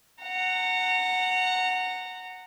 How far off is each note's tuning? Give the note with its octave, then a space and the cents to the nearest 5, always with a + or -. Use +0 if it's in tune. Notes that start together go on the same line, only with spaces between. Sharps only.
F#5 +0 A#5 -25